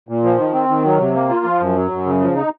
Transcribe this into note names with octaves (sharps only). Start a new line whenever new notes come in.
A#2
F3
D#3
C4
D#3
F#3
C3
A#3
F4
F3
F#2
F#3
F#2
C#3
F3
D#4